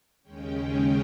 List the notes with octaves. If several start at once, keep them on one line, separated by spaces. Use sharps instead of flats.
D#2 C#3 G#3 C#4 G5